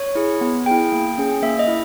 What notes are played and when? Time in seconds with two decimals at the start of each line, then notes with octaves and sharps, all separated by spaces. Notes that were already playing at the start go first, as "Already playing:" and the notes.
Already playing: C#5
0.15 E4 G#4
0.41 B3
0.66 E4 G#4 G5
0.92 A#3
1.18 C#4 G#4
1.42 A#3 E5
1.59 D#5
1.68 E4